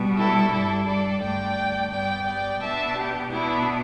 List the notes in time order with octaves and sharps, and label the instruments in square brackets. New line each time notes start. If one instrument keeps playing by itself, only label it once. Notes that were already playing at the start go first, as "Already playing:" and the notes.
Already playing: [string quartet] B2 G3 B3
E4 A4
G2 G3 D4 E4 A4
A4 D5
G2 D3 A3 D5 G5
G2 G3 B3 D5 G5
D5 G5
B2 B3 D4 E5 A5
G4
B2 B3 D4 E4